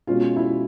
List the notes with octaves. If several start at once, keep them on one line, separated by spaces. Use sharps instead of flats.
B2 G#3 C#4 F4
E4